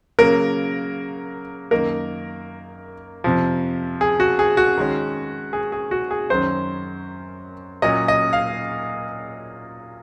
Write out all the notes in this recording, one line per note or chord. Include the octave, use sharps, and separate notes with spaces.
C#3 F#3 A#3 A#4
F#2 D#3 A#3 D#4 A#4
F2 C3 F3
G#4
F#4
G#4
F#4
D#3 G#3 C#4
G#4
G#4
F#4
G#4
F#2 D#3 F#3 C#4 C5
A#2 F#3 C#4 D#5
D#5
F5